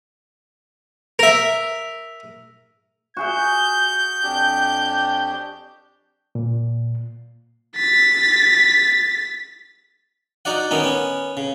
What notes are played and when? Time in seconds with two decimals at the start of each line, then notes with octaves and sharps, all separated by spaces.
1.19 A#4 E5
3.17 F#4 G#4 E5 G6
4.23 F2 D4 G4
6.35 A#2
7.76 A6 B6
10.45 D#4 F#4 D5 F#5
10.71 D#3 B3 C#4 D#4
10.84 B3 C#4
11.37 C#3